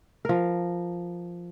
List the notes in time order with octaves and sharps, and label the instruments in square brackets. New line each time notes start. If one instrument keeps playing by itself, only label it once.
[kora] F3 A#4